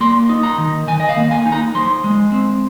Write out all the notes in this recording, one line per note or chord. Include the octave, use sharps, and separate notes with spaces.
A#3 C6
D#4
A#5
D#3
D#3 G#5
D#5
F5
A#3
G#5
D#4
A#5
F3 C6
G#3
C4